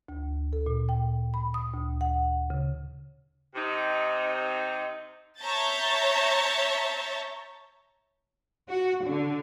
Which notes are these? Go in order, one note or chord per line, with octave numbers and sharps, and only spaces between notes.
D2
A4
A#2
G5
B5
D#6
D2
F#5
C#3
C3 D#4
C#5 E5 A5 A#5 G6 A6
F#4
D3